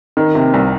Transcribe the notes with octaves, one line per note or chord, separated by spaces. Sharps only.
D#3
C3
C2